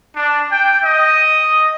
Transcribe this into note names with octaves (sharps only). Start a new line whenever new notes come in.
D4
G5
D#5